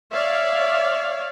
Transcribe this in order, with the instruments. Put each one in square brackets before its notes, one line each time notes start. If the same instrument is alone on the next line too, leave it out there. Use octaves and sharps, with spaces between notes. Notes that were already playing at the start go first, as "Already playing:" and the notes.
[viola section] C#5 D5 F5 [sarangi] E5